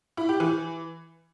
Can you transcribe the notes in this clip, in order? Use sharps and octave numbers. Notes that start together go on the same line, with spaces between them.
E4
G4
E3